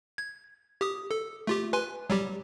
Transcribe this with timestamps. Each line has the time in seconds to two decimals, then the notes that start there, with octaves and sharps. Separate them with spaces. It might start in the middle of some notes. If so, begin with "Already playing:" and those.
0.18 G#6
0.81 G4 D#6
1.11 A4
1.47 A3 F4 G4
1.73 B4 G#5 C6
2.10 F#3 G3 G4